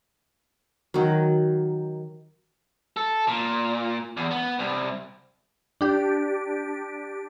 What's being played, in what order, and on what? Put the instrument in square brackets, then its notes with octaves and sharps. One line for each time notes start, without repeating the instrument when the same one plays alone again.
[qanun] D#3 F#3
[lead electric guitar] A4
A#2
E2
B3
C2
[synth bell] D4 G4